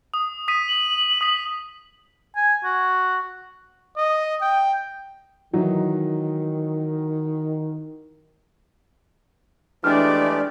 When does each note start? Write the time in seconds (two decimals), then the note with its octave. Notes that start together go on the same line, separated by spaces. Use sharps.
0.14 D#6
0.48 D#6 B6 D#7
0.68 F#7
1.21 D#6 B6
2.36 G#5
2.64 F#4
3.97 D#5
4.42 G5
5.53 D#3 E3 F#3 D#4
9.84 E3 G#3 A3 D4 G4 D5 F6